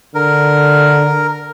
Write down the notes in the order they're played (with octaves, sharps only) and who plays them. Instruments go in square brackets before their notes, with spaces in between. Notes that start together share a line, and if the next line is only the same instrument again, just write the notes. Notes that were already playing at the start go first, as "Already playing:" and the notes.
[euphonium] D3 [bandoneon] A#4